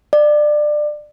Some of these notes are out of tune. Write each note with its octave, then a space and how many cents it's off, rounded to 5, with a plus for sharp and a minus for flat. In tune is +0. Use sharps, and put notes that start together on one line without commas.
D5 +25